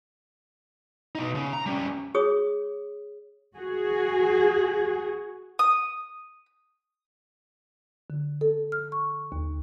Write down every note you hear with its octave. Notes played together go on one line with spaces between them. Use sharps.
B2 D#4
C#3
A#5
G3 C#4
G#4 C#5 D#6
F#4 G#4
D#6
D3
A4
F6
C#6
D#2